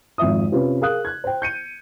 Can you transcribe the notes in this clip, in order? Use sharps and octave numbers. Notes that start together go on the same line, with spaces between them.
G#1 F2 F4 E5 D#6
C3 C#4 F4 B4
G#4 A#4 F5 D#6 F#6
F#6 G#6
C5 G5
G6 C#7 D#7